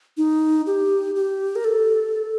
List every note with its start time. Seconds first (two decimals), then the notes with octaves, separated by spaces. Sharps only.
0.17 D#4
0.67 G4
1.16 G4
1.56 A#4
1.64 A4